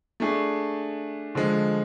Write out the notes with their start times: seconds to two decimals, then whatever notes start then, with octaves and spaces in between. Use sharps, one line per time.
0.20 A3 D4 G#4
1.35 D3 F3 G#3